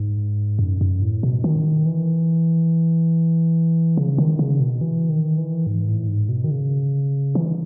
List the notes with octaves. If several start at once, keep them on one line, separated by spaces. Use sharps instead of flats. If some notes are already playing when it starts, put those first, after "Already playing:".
Already playing: G#2
F#2
F#2
A2
B2
D#3
E3
C#3
D#3
C#3
B2
E3
D#3
E3
G#2
A2
G#2
B2
D#3
C#3
E3